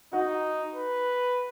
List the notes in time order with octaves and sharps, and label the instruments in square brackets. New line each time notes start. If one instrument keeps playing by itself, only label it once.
[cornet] D#4 [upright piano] F#4
[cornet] B4